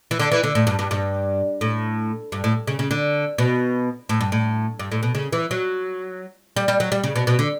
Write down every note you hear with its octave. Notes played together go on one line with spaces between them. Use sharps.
E3
D3
E3
D3
A2
G2
G2
G2
A2
G2
A2
C#3
C#3
D3
B2
A2
G2
A2
G2
A2
B2
C#3
E3
F#3
G3
G3
F#3
G3
C#3
B2
B2
D3